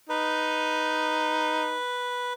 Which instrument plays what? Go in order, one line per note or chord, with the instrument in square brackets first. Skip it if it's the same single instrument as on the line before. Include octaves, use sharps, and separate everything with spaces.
[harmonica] D#4 [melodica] B4